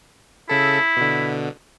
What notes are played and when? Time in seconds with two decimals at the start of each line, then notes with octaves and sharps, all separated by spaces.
0.49 C#3 E4 A4
0.97 B2 D3